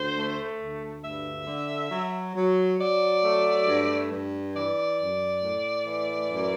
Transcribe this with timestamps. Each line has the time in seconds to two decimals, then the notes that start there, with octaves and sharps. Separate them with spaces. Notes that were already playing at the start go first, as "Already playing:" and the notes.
Already playing: D2 C5
0.15 A3
0.59 D2
1.03 G2 E5
1.47 D3
1.91 F#3
2.35 F#3
2.79 F#3 D5
3.23 A3
3.67 G2
4.11 G2
4.55 E3 D5
4.99 F#2
5.43 A2
5.87 E3
6.30 F#2